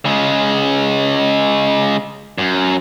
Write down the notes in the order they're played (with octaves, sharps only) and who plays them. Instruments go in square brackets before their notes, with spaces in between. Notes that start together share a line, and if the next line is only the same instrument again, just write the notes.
[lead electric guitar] C#3 G#3
F#2